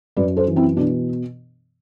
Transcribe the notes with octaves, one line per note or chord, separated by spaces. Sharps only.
F#2 B4 D5
A4 C5
E3
C4 E4
B2 D4